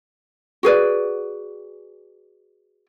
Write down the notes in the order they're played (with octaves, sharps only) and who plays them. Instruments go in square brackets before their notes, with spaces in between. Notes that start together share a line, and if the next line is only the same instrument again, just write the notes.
[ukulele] F#4 G#4 B4 D5